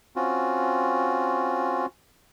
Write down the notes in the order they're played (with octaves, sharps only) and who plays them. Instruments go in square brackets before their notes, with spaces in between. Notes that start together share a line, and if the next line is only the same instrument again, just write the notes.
[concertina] C4 C#4 F4 F#4